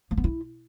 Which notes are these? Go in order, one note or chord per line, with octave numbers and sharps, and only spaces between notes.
A#3
B3
E4